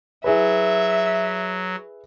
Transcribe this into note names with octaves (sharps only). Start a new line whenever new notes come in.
F#3 E4 G#4 B4 E5